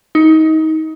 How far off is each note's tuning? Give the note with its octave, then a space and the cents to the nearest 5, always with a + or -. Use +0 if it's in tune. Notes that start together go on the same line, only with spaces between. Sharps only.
D#4 +25